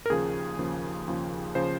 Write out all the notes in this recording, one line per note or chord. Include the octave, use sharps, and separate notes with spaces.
A#4
D#2 C#3 F3 G#4
D#2 C#3 F3
D#2 C#3 F3
C#3 F3 C5